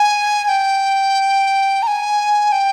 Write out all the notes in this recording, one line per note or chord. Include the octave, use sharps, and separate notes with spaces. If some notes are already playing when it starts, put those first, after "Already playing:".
Already playing: G#5
G#5
G5
A#5
G#5
G5